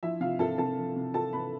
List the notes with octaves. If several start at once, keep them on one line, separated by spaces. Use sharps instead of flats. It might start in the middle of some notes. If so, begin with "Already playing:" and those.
F3 E4 E5
C3 F4 F5
C4 A4 A5
C3 A4 A5
F3
C3
C4 A4 A5
C3 B4 B5